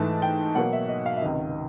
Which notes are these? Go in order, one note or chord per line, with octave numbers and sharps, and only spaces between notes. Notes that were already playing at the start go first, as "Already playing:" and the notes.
Already playing: G#2 E3 A3 A5
G5
B2 F#3 A#3 F#5
E5
D#5
F5
E5
C#2 C3 D#3 D#5